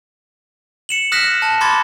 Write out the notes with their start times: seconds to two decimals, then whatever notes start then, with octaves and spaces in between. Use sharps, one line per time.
0.89 C#7 E7 F#7
1.12 D#6 F6 F#6 A#6 B6 E7
1.42 A5
1.61 B5 C6 D6 G#6 A6